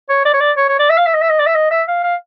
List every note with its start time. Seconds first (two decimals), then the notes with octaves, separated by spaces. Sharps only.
0.09 C#5
0.25 D5
0.34 C#5
0.41 D5
0.57 C#5
0.69 C#5
0.79 D5
0.90 E5
0.97 F5
1.07 E5
1.15 D#5
1.22 E5
1.30 D#5
1.39 D5
1.47 E5
1.55 D#5
1.71 E5
1.88 F5
2.04 F5